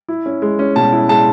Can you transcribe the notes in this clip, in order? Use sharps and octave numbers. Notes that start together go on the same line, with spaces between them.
E4
C#4
G#3
C#4
B2 A5
E4
G#3 A5